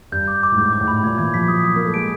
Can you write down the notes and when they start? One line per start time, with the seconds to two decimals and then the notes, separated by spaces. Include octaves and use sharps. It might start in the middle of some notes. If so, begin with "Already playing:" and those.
0.12 G2 G6
0.28 D6
0.43 D6
0.52 A2
0.58 G#2 G6
0.73 D6
0.81 A2
0.88 B5
1.03 A#2 G#6
1.18 E3 G#6
1.34 F3 B6
1.48 F#3 D#6
1.65 D#6
1.75 A#3 D#6
1.85 A3
1.94 G#3 D7